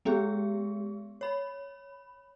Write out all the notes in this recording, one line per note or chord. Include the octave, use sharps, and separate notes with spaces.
G#3 B3 G4 G#4
C#5 B5